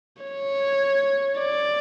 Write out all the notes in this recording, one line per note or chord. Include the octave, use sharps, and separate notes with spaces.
C#5
D5